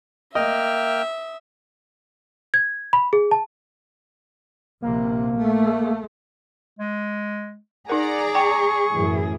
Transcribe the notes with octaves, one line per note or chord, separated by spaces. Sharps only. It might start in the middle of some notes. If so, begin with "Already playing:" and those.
A#3 D#5 E5 G5 F6
G#6
B5
G#4
A5
A#1 C3 A#3
A3
G#3
D#4 G#4 A#4 D5 F#5 A#5
G5 C#6
F#2 A2 E3